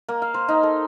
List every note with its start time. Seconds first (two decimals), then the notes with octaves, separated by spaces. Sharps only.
0.09 A#3
0.22 F5
0.34 C5
0.48 D#4
0.63 A4